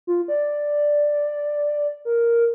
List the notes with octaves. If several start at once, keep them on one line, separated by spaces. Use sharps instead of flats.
F4
D5
A#4